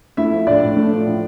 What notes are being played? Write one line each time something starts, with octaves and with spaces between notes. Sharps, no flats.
A3 E4 E5
F3
A2 D4 D5
A2
A3
F3
A2